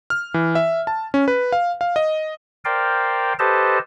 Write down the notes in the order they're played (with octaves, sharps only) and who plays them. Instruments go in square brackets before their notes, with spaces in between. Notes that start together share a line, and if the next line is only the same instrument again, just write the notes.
[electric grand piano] F6
E3
E5
A5
C#4
B4
F5
F5
D#5
[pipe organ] A#4 C5 D5 F5 G5
G4 A4 B4 C5 D#5 A5